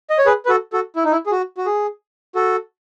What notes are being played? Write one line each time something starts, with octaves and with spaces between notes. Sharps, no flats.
D#5
C#5
G#4 B4
B4
F#4 A4
F#4 A4
E4
D#4
E4
G#4
F#4
F#4
G#4
F#4 A4